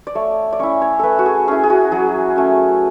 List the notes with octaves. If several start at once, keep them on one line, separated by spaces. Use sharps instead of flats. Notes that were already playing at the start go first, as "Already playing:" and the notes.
D5
A3 C#5
D5
C#4 E4 C#5
C#5
A3 A4 B4
F#4
G#4
C#4 E4 G#4
G#4
F#4
F#3 G#4
A3 C#4